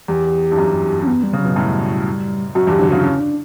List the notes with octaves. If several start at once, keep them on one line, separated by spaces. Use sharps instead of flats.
E2 G4
G2
F#2
C#4
B3
G3
C#3
F#3
B2
F#2 A2 G3
F#2 F#4
E2 G2
G4
D3 F#3
C#3 E3 F#4
C#4
D4